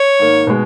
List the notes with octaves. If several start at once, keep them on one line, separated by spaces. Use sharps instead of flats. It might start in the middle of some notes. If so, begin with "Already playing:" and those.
Already playing: C#5
G#2 D#3 A#3
B2 G#3